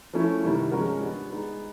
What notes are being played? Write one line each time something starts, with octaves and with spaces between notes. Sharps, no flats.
F3 A3 C#4 E4
C3 D#3 G3 B3 E4
F3 G#3 C#4 F#4 A#4
G3 B3 D4
G#3 B3 D#4